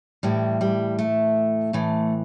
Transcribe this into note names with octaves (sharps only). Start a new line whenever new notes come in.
A2 E3 G3
G3
A3
A2 E3 A3